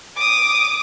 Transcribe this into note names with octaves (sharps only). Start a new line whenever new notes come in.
D6 D#6